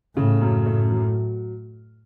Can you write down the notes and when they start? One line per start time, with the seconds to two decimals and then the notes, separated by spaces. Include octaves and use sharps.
0.16 A2 C#3
0.41 F#2
0.66 A2 A3
0.92 F#3